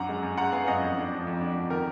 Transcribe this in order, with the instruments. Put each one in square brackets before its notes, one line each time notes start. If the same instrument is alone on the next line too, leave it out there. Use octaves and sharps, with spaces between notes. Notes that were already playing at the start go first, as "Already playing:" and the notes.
Already playing: [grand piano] F#2 D4 F#5 A#5
G#3
F#2
G#3 F#5 A#5
B3 F5 G#5
F#2 D#5 F#5
F2
D4
F3
F2
D4
F2
D#3 A#4